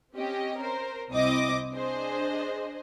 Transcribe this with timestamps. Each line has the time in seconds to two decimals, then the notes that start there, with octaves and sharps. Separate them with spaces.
0.16 C4 C#4 G4 D#5
0.60 A#4 C5
1.11 C2 C4 E4 D#5 D6 D#6
1.74 D4 G#4 C5 D#5